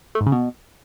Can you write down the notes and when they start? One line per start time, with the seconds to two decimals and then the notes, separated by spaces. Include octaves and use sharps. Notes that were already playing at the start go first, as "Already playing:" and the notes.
0.15 A3
0.21 G#2
0.27 C#3
0.32 B2